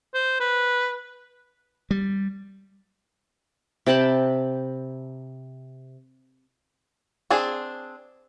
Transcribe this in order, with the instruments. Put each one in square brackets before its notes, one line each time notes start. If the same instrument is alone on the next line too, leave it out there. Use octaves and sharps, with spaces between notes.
[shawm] C5
B4
[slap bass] G3
[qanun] C3 G5 A5 B5
[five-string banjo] C4 D4 G#4